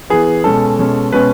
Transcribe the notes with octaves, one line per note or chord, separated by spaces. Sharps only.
E3 B3 G#4
B2 G#3 C#4 A4
B2 G#3 C#4
B2 G#3 C#4 B4